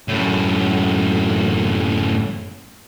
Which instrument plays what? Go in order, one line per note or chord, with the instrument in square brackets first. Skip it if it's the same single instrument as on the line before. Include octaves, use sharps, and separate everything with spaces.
[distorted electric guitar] F#2 A2